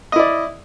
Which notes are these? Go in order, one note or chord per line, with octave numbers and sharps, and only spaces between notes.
E4 D5 D#5